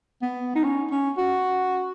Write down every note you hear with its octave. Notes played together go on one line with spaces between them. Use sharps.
B3
D#4
C#4
C#4
F#4